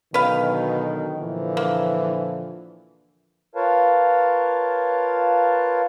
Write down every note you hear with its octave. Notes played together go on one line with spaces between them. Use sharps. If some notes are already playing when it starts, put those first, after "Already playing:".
B2 D3 D#3 F#3 B4 F5
A#2 D3 E3 F3
A#3
F4 A#4 B4 C#5 F5 A5